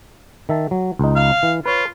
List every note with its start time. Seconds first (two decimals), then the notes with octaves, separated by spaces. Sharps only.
0.49 D#3 E5 A5
0.71 F#3
0.99 C#2 D#4
1.16 F5
1.43 E3
1.66 F4 B4 C#5